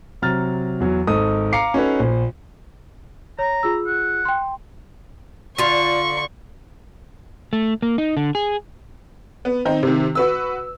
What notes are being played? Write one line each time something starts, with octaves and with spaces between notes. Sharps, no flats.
C3 F#3 A#5 F6 A6
E2 F#3
G#1 D#4 A4 D#6
F5 A#5 D6 C7 C#7
C#4 D#4 F#4 A4 B4 C#5
A#1
C#5 A#5
F4 G#4 E6
F#5
G5 C6
D3 F4 D5 F5 C#6
A3
A#3
D#4
D3
G#4
B3
D#3 C4 D#4
C3 D#3
F#4 B4 E6